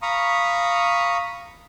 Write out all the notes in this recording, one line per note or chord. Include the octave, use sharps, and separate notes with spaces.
F5 A#5 B5 C#6 D#6